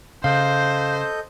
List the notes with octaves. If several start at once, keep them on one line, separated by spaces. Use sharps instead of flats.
C#3 A4 C5 D#5 F5 G6